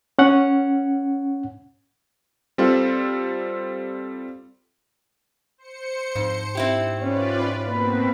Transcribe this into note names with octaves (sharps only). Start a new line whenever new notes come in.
C#4 F#5
G3 C4 F4 A4 F5
C5 C#7
F2 G#2
C4 E4 G4
C#4 F4 B4 D5
B2 A#3 C4 B4